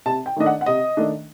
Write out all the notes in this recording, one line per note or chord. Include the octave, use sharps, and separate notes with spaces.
C3 A5
G5
D#3 A3 D4 D#5
F#5
F#5
C3 D#5
D#3 A3 D4